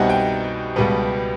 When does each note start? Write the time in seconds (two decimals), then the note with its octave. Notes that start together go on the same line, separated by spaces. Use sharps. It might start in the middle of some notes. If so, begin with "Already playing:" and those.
Already playing: C2 B2 G3 C4 D#4 F#5 G#5
0.10 G5
0.76 C#2 B2 G3 B3